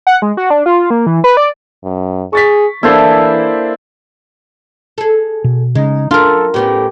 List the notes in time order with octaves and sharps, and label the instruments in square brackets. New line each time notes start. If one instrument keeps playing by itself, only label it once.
[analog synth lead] F#5
G#3
F#4
D4
F4
A#3
E3
B4
D5
[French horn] F#2
[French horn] G#4 [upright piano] C#6 A6 B6
[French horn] E3 [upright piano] A#3 D4 [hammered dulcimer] E4 A4 C5
[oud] G#4 A4
[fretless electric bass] B2
[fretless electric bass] C#3 [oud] G#3 [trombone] D#4
[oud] F#2 [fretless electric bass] D4 [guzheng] F4 A#4 [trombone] A4
[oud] A2 B3 C#4 [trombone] G4